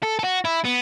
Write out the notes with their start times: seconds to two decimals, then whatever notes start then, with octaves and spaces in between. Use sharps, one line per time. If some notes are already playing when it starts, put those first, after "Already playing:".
0.03 A4
0.19 A4
0.24 F#4
0.45 E4
0.65 B3